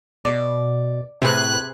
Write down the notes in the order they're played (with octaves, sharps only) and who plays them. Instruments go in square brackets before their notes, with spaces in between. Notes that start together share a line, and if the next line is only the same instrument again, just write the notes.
[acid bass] B2 [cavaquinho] D5
[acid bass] A2 [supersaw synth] C3 [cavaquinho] G#4 G#5 [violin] B4 F#6